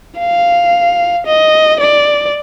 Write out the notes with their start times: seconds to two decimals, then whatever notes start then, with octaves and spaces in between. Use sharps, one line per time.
0.20 F5
1.27 D#5
1.80 D5